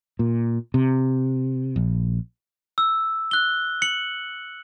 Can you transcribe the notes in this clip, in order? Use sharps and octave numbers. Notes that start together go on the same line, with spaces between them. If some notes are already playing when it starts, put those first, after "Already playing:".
A#2
C3
A#1
E6
F#6 G7
C#7 F#7